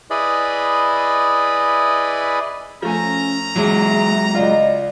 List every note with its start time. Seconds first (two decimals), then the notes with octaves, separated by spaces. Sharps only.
0.10 E4 G#4 B4 D5 D#5 B5
2.82 F3 A3 C#4 G#5 A#5
3.56 E2 F#3 G#3 G#4 E5
4.34 C#2 F4 D5 D#5